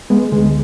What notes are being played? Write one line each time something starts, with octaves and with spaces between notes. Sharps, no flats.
G#3 B3
D2 D3 G#3